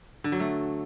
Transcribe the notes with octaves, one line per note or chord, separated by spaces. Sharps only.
D3
F#3
A3